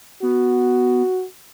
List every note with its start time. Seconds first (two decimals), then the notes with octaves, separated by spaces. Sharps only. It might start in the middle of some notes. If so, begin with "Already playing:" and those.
0.23 B3 F#4